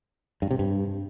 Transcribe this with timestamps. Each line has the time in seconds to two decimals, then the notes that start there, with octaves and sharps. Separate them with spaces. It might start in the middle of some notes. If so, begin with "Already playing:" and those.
0.42 G2
0.51 C3
0.59 G2